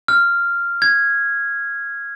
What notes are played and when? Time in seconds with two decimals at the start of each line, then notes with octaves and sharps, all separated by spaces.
0.08 F6
0.82 G#6